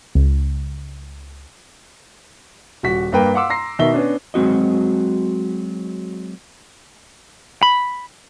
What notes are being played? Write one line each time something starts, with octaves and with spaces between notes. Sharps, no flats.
C#2
D#1 F#4 B6
G2 A#3 B4 G5
F5 F#5 C6 D6 E6
A#5 C6 A#6 C7
B2 D#3 E5 G7
B3 C#4 D4
F#3 G#3 C4 F#4 D#5
B5